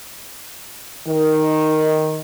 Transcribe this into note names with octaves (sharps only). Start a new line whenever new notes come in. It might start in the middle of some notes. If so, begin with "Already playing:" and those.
D#3